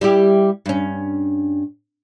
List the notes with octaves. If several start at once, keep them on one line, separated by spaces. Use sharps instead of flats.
G3 E4 G4
G2 C#4